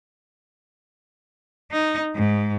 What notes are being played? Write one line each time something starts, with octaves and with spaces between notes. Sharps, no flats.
D#4
G#2